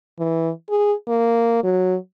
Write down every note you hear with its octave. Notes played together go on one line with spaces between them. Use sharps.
E3
G#4
A#3
F#3